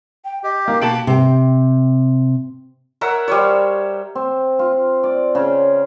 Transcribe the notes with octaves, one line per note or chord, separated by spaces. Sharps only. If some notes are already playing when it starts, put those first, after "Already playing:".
G5
G4 D#5
A#3 F5
B2 G4 A5 D7 F#7
C3 G5
A#4 C#5 E5 F#5
G3 C5 C#5
C4
F4
D5
C#3